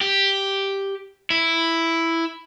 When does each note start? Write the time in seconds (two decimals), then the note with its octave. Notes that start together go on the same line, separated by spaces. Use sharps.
0.01 G4
1.30 E4